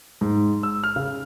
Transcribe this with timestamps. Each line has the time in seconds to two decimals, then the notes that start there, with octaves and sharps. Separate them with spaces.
0.21 G#2
0.63 E6
0.84 F6
0.96 C#3